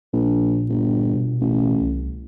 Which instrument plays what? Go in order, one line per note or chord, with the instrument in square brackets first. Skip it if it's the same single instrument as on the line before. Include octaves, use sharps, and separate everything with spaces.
[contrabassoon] A#1 [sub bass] A#2
[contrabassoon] G1
[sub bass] B2
[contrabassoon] A1
[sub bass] C2